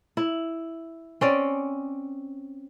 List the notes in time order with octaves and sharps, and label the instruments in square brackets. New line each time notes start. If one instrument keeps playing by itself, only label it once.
[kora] E4
C4 C#4 D5